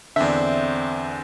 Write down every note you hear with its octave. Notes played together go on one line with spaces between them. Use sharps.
E2 D3 C4 D4 E5